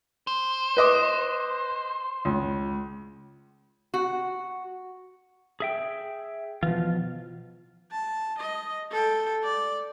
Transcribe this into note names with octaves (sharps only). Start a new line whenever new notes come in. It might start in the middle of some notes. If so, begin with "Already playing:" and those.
C5
B4 D#5 D6
C#2
F#4
G#4 E5 G5
B2 E3 F3 F4
A5
D#5
A4 G5
D5